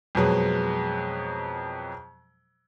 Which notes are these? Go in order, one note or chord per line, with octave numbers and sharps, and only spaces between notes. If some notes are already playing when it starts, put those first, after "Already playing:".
F2 B2 F#3 G#3